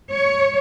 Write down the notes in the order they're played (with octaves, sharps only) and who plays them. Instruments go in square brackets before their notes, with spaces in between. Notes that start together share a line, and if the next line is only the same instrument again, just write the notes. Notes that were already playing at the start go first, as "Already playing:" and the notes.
[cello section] C#5